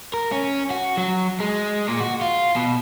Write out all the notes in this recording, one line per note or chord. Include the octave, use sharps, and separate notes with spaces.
A#4
C#4
F#4
F#3
G#3
A#2
F#4
F4
B2